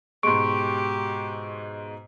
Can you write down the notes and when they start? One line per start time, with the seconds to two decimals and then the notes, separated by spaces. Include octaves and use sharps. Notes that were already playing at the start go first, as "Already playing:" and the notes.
0.23 G#2 B2 G#3 G4 C6 C#6 D7